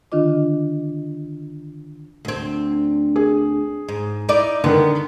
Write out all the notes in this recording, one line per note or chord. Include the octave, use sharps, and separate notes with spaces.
D3 D#3 D4 F4 D#5 D6
D2 C4
G#4
G#2
D#4 E4 D5
D3 D#3 B3